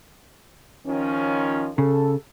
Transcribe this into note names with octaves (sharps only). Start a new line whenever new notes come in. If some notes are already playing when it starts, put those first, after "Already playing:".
D#3 F3 C#4
C#3 A4